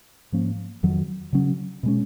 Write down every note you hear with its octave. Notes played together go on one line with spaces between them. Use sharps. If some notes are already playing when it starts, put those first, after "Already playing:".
G#2 F3 A#3 C#4
F2 D#3 F#3
C#3 F#3 C#4
B2 G#3 C#4